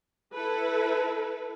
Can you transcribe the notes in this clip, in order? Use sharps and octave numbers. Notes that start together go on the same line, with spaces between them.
E4 A4 B4